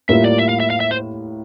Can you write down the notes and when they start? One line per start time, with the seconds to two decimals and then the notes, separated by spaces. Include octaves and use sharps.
0.09 A2 G3 A#3 F4 A#4 E5
0.24 D5
0.39 E5
0.49 F5
0.60 E5
0.70 F5
0.80 E5
0.91 C5